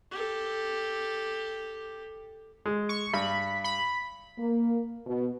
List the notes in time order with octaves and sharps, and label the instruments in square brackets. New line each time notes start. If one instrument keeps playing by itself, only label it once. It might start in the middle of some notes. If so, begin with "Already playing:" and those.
[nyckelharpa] G4 A4
[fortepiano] G#3
[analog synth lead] C#6
[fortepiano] G2 [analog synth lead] B5
[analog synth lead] B5
[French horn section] A#3
B2